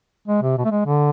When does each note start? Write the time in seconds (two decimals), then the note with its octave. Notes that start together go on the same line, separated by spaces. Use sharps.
0.28 G#3
0.42 C3
0.58 B2
0.65 A3
0.71 G#3
0.86 D3